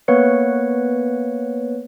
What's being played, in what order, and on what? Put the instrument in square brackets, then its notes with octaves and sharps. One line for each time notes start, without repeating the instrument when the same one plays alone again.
[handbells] A#3 B3 B4 C#5 C#7